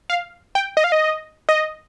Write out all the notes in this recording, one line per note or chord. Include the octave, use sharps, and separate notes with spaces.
F5
G5
D#5
F5
D#5
D#5